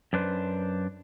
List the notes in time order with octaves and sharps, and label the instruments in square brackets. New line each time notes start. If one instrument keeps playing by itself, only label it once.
[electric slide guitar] F#2 D4 B4 C5